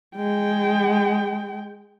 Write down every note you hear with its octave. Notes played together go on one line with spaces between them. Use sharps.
G#3 G5